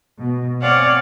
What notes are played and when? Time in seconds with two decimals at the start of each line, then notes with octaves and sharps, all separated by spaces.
0.18 B2
0.59 C4 C#5 D5 F5 F#5 G#5